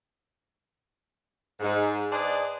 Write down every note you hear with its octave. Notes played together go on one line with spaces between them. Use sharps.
G#2
D4 G#4 B4 C5 D5 D#5